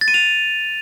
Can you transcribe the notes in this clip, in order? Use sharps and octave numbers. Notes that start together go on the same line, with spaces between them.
A6
D#7
F7